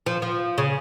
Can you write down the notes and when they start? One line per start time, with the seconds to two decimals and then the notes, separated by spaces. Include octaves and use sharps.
0.06 F3
0.22 F3
0.58 C#3